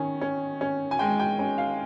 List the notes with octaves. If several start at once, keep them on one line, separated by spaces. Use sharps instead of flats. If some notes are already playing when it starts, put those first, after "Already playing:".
Already playing: D#3 C#4
C#4
C#4
G#5
G#3 G5
G5
C#4
F5